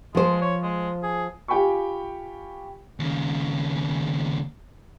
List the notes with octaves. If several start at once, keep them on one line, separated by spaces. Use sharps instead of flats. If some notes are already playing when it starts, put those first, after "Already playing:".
F3 G#3 C5
C#5
G#3
G#4
F4 G4 G5 G#5 B5 C#6
D#2 C#3